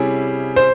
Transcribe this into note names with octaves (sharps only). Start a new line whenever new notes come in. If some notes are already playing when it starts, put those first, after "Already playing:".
Already playing: C3 G3 C#4 E4 G#4
C5